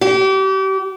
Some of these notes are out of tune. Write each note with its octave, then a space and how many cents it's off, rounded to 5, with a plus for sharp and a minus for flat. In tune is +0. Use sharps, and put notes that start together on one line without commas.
G4 -35